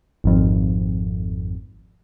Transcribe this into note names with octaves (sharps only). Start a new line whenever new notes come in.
G#1 F2